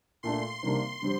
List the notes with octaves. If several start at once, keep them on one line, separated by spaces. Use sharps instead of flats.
A#2 A3 D4 C6
C3 D#3 G3 A#3 D4
D3 G3 C4